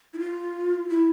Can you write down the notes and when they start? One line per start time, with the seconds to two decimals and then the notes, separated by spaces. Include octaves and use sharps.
0.14 E4
0.19 F4
0.90 E4